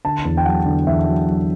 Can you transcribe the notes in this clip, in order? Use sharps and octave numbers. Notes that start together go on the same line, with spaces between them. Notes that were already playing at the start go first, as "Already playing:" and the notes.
D3 A5
E2
G5
F#3 F#5
D3
E2 E5
F#3
F#3